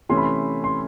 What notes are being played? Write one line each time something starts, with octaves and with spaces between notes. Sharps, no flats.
C3 E3 A3 C#4 C6
B5
C6
C6